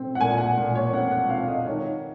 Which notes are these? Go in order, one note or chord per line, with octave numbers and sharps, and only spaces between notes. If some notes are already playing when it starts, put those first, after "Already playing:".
Already playing: C4
F#5
A#2 G#5
F#5
A#2
C#5
C4 F#5
F#5
C4 F5
D#5
D#3 C#5